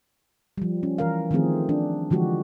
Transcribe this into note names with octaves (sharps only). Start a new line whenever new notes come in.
F3 G3
C#4
E3 A#4 F5
D#3 F3 A3 C4 G#4
D4
D3 E3 F3 G#3 F#4 G4